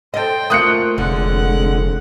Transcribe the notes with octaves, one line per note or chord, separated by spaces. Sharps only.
A4 C5 D#5 G5
A3 A#3 F4 D#6 F#6 C#7
F1 D3 G#3 F#5